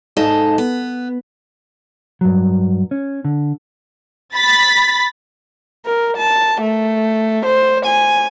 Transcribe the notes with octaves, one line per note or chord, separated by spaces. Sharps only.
G#2 D#4 A4 D#5 F5 A5
B3
G2 F#3
C#4
D3
B5 A6 B6
A#4
A5
A3
C5
G#5